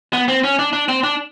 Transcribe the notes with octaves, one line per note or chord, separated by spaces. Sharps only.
B3
C4
C#4
D4
D4
C4
D4